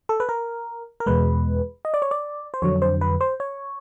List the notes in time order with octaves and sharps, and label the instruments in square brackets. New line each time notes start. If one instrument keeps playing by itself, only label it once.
[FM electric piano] A4
B4
A#4
A#4
E2 B2 G#3 B4
D#5
D5
C#5
D5
C5
F2 D3 F#3 C#5
C5
B4
C5
C#5